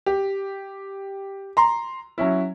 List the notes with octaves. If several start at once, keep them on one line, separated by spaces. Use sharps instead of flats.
G4
A#5 C6
F#3 C#4 E4